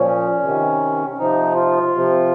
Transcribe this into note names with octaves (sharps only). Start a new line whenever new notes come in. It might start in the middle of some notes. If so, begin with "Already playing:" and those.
Already playing: A#2 F3 C#4
C3 D#3
C3 F3 D#4
F4
C3 F3